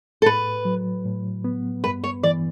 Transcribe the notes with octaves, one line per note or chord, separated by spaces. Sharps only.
A4
A2 B4
F#3
A2
B3
G2 B4
C#5
E3 D5